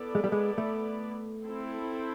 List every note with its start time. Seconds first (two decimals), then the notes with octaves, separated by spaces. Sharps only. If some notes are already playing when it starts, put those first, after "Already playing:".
Already playing: B3 E4 A4 D5
0.15 G#3
0.24 G3
0.32 G#3
0.58 A3
1.43 C4 E4 A4